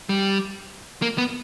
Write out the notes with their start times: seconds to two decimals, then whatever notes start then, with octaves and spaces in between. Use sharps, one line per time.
0.09 G3
1.02 A#3
1.18 B3